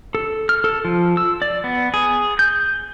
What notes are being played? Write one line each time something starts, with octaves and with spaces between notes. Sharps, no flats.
A4
F6
A4
F3
E6
D5
B3
G#4
G6